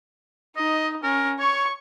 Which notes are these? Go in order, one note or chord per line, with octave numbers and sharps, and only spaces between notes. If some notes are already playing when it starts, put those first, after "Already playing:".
D#4 D#5
C#4 A#4
C#5 C#6